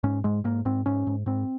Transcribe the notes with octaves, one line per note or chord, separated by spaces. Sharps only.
G#2 C#4
G#2 G#3
G#2 A#3
G#2 C4
G#2 C#4
G#2
G#2 C4